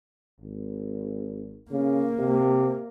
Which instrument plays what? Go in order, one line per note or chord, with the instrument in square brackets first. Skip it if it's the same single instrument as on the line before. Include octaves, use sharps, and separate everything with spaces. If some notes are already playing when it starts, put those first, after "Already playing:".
[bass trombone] G#1
[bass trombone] C#3 [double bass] A#3
[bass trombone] C3